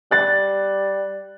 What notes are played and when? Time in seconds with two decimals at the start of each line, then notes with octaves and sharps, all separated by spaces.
0.11 G3 F#6 A6